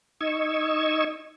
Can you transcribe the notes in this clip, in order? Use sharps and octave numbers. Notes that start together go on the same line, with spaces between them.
D#4 D#5 C#6 E6 G#6